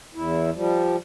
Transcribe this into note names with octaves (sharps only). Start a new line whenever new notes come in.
E2 E4
F3 G3